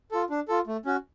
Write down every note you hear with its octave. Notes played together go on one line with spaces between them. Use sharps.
F4 A4
D4
F4 A4
A3
C#4 F#4